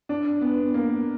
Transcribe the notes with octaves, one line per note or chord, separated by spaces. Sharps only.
D4
B3
A#3